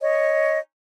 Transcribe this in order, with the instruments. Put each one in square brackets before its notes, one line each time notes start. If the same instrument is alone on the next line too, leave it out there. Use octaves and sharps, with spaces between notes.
[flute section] C#5 D#5